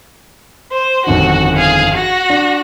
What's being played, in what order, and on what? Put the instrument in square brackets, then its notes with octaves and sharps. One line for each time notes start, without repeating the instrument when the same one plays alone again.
[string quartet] C5
[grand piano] G1 F2 D#3 [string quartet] F#4
[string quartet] G#4 F5
F#4 A#6
[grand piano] D4